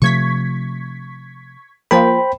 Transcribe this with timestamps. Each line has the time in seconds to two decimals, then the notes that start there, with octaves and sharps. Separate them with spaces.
0.02 C3 F3 A3 C#6 G#6 B6
1.91 F3 A#3 C5 G5 B5